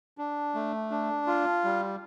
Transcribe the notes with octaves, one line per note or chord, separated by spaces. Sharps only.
D4
A3
D4
F4
G3